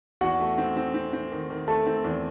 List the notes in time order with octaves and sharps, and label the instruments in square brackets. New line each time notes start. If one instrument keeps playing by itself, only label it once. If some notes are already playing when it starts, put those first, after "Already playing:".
[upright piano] E2 [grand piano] F#4 F#5
[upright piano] A3
C4
C4
C4
C4
D#3
D#3
[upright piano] A3 [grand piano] A4 A5
[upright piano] C4
E2